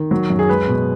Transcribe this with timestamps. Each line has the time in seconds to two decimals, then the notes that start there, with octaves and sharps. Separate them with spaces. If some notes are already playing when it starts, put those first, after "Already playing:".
Already playing: D#3
0.11 F#3
0.30 F#2
0.39 G#4
0.49 G#3 B4
0.68 B2